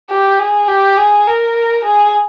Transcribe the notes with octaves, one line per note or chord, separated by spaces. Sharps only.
G4
G#4
G4
G#4
A#4
G#4